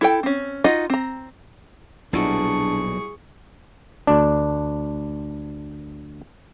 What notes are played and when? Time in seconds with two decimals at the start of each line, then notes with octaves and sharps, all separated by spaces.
0.01 E4 A4 G5
0.23 C4 C#4
0.64 D#4 F4 F#4 D#5 F#5
0.90 C4 A#5
2.13 B1 A#2 G3 D4 E4 F#4 G#4 C#6
4.07 D2 D4